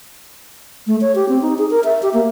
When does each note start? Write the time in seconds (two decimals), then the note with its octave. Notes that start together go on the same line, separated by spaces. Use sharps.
0.87 A3
1.01 C#5
1.15 G4
1.29 C4
1.42 D#4
1.58 G#4
1.70 A#4
1.84 E5
2.03 G4
2.14 A#3